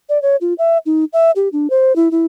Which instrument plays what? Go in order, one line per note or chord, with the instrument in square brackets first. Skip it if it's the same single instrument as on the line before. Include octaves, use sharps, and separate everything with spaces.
[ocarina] D5
C#5
F4
E5
D#4
E5
G4
D4
C5
E4
E4